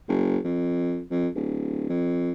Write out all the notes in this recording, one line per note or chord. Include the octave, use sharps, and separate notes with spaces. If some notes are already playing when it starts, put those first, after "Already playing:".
F#1
F2
F2
D1
F2